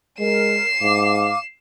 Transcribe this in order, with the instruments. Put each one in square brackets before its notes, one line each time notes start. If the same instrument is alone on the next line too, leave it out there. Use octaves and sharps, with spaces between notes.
[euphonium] G#3 [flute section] A#4 [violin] C7 E7
[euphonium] G#2 [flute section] F5 D6